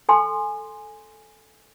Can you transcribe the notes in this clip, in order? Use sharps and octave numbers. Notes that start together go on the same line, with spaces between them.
A4 G#5 C6